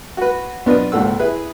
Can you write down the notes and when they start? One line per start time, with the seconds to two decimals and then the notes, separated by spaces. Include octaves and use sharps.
0.17 F#4 B4
0.66 B1 B3 D4 F4 B4 D#5
0.92 G#1 C#2 A#2 A4 F#5 E6
1.19 E4 G#4 B4 E5